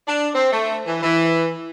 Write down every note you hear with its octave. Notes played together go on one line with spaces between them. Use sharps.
D4
C4
A3
E3
E3